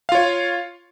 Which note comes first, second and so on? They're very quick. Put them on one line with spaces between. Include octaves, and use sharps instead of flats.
F5 F4 C#5